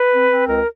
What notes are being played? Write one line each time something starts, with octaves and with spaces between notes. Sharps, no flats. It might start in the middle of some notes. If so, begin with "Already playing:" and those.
Already playing: B4
C4
C4
C#2 A#4